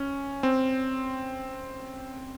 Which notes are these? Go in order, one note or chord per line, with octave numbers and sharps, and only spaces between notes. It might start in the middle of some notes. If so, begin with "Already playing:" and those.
Already playing: C#4
C4